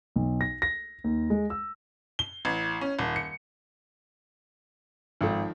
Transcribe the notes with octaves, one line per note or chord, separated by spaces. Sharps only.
B1
A#6
A#6
D#2
G#3
E6
G7
A1
C#4
D#1
C#7
G#1 D#3 F3 A4